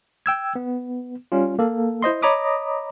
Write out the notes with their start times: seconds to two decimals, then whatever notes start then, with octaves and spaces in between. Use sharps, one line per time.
0.26 G5 E6 G#6
0.55 B3
1.32 G3 C#4 F4
1.59 A#3 A4
2.02 E4 C5 D#5 C6
2.22 C#5 D#5 A#5 B5 D6 D#6